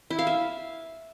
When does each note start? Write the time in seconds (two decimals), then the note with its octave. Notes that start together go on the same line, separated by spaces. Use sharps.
0.10 E4
0.19 F5
0.27 E5